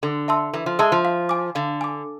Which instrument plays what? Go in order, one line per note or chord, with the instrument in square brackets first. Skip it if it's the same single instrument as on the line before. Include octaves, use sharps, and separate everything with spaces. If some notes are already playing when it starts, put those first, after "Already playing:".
[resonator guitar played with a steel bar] D3 [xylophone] A4
[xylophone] E5 A5 C6 E6
[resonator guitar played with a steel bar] E3 [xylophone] A4
[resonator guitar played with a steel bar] F3
[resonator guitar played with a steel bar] G#3 [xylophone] E5 A5 C6 E6
[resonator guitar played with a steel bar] F3
[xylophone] F5
G#5 D6
[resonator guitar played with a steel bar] D3 [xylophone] F5
[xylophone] G#5 D6